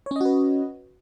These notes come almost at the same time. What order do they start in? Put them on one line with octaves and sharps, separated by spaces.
C#5 C#4 D#5 F#4 B4